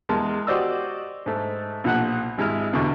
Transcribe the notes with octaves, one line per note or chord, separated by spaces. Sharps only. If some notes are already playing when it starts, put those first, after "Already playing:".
E2 G#3 A#4 A5 C6
F#4 G4 C5 D5 D#5 E6
G#2 A3
B1 A#2 F3 F#5 F#6
G#1 G#3 E4 F6
E2 B2 D3 C#6